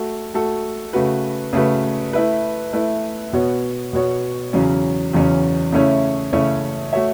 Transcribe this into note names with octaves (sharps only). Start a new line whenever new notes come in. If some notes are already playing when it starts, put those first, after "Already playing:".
Already playing: A3 F#4 A4
A3 F#4 A4
C#3 A3 F#4 B4
C#3 A3 F#4 B4
A3 E4 B4
A3 E4 B4
B2 B3 F#4 C#5
B2 B3 F#4 C#5
E2 C#3 F#3 C#4
E2 C#3 F#3 C#4
C#3 A3 C#4 E4 C#5
C#3 A3 C#4 E4 C#5
A3 F#4 C#5 E5